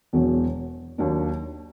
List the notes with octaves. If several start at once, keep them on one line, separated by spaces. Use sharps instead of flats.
E1 E2 B2 F#3
D#2 D#3 F#3 A#3 D4